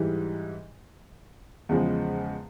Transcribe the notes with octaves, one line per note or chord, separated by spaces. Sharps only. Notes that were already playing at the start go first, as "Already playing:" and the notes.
Already playing: G#2 E3 G3
E2 C#3 F3 G#3